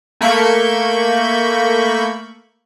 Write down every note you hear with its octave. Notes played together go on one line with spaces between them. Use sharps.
A3 A#3 B5 C#6 G6